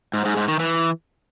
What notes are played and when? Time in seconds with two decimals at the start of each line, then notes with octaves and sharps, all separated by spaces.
0.13 G#2
0.25 G#2
0.37 G#2
0.48 D#3
0.60 E3